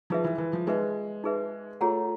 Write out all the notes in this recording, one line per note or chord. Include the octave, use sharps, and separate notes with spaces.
F3 D#4 G#4 B4 E5
E3
E3
F3
G#3 D#4 G#4 B4 E5
D#4 G#4 B4 E5
A3 F4 G#4 C#5 F#5 A#5